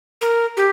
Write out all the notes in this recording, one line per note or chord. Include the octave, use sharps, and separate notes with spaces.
A#4
G4